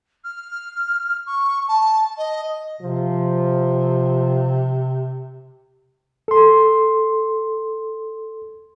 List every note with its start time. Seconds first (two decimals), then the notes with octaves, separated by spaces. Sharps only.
0.24 F6
1.26 C#6
1.68 A5
2.18 D#5
2.81 C3 F3
6.28 A4 C6